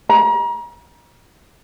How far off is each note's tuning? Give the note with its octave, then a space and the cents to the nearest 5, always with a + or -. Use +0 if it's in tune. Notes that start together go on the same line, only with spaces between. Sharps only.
A#5 +35